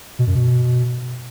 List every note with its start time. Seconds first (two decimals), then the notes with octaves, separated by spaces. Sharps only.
0.19 B2
0.27 F#2
0.35 B2